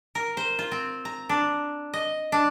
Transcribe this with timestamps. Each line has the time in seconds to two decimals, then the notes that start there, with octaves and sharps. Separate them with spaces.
0.15 A#4
0.37 C5
0.59 F4
0.72 C4
1.05 A#5
1.29 D4
1.94 D#5
2.32 D4